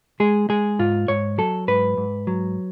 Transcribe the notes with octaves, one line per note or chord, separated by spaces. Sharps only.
G#3 G#4
G#3 G#4
G#2 F4
G#2 C#5
F#3 A4
G#2 B4
G#2
F#3